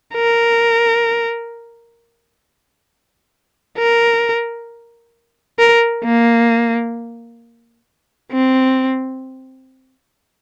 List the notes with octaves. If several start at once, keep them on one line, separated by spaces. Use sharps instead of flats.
A#4
A#4
A#4
A#3
C4